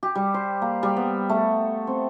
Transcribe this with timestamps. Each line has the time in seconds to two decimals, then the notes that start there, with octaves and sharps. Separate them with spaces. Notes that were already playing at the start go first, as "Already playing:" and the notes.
0.03 G4
0.15 G3
0.34 C5
0.62 A#3
0.83 G3
0.97 B3
1.29 A3
1.87 C4